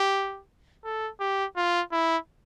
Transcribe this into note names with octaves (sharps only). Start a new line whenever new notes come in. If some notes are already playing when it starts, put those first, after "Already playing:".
Already playing: G4
A4
G4
F4
E4